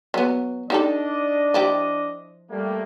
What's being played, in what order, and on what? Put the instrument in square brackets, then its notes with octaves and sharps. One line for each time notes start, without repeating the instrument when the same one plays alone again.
[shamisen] F#3 B3
[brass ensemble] D4 D5 D#5 [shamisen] D#4 G4 A4
[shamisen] F3 E4 G4
[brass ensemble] G3 A3 A#3